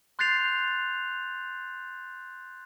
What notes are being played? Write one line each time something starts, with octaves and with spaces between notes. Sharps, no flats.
C6 F#6 G6 A6 C7 F7